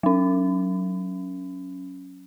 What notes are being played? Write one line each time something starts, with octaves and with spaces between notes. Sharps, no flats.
F#3 C#4